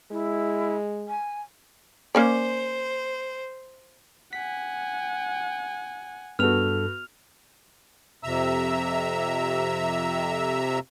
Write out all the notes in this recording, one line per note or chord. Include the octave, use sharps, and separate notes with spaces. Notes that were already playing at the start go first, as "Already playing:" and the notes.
G#3 E4
G#5
A#3 C#4 C5 D5
F#5 G#5 B6
G2 B3 F#4 A4 F6 F7
F2 C3 E5 A#5 E6